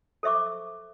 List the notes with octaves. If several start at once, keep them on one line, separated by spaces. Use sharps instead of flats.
A4 C5 E5 C#6 D6